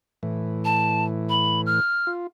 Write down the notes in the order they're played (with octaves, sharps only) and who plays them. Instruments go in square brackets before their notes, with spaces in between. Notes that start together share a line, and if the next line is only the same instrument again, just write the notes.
[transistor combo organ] A2 E3
[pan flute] A5
B5
F6
[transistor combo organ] F4